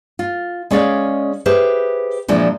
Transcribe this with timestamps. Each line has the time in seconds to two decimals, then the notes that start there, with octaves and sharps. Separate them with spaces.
0.19 F4
0.71 G#3 C#4 G#4 D5 F5
1.46 G4 G#4 B4 C5 E5
2.28 A#2 E3 F3 G#3 D4